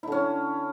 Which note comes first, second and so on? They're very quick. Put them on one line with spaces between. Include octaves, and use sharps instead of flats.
E4 D3 C#4